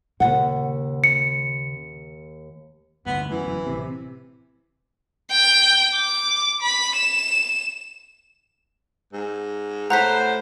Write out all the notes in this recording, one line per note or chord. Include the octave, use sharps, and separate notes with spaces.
D#2 A#2 C#3 F#5
C#7
G1 D2 A2 B3
F#2 E3
G1 E4
A1 C3
G5
D6
B5
E7
G#2
A2 C5 F#5 A#5 F#6 B6